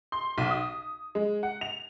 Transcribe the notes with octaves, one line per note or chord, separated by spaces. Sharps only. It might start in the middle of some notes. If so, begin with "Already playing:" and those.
C6
B1
D#6
G#3
F#5
F7